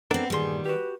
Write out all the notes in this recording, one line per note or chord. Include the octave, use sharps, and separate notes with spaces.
B3 C4 D4 A4 A#4
G2 A#2 D#3 G3 G#4 C6
F#4 G4 B4